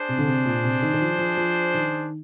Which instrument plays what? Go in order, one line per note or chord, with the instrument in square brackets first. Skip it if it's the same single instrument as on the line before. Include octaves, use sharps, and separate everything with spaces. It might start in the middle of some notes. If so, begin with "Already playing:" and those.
Already playing: [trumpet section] D4 G#4 C5
[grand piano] C3
D3
C3
A#2
C3
D#3
D#3
F3
F3
F3
D#3